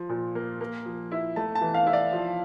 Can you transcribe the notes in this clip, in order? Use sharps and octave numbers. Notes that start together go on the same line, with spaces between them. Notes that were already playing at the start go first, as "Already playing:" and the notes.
Already playing: F3
A#2
A#3
A#3
F3
E4
A3 A5
A5
E3
F5
E4
D5
F3